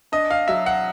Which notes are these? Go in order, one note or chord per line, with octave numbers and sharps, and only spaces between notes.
D4 D#5
F5
F#3 E5
F#5